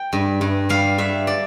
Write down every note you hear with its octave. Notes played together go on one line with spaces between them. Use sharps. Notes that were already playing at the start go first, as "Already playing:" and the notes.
Already playing: G5
G2
G2
G3 F5
G2 E5
D5